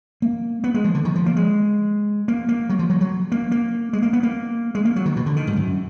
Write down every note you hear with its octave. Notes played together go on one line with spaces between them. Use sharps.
A#3
B3
G#3
F3
D3
D#3
F3
A#3
G#3
A#3
A#3
F#3
F3
F#3
F#3
A#3
A#3
G#3
A#3
B3
A#3
G#3
A#3
F#3
D#3
B2
D3
D#3
G#2
F#2